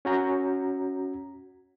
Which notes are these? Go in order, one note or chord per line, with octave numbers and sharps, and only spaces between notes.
C#4 F#4 A#5